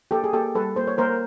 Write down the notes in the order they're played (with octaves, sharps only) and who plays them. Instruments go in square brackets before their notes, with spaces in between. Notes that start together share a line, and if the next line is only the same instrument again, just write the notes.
[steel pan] A#3 G4 A4
G#4
A#3 G4 A4
G3 A4 B4
A#3 C5
C#5
A#3 A#4 C5